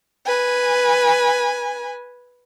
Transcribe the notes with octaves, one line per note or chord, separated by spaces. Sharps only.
B4 G#5